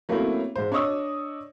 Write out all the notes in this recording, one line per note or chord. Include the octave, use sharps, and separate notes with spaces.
F#3 A3 A#3 C4 C#4 E4
G#2 C5
D4 C#5 D#5 C#6 D#6 E6